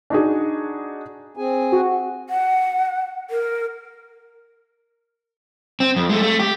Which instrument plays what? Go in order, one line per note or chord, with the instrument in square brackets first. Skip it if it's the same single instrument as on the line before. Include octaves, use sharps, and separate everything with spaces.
[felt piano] D4 D#4 F#4 G#4
[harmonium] C4 G#4 G#5
[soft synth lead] F#4
[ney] F#5
A#4
[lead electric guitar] C4
F2
G#3 A3
A3
G4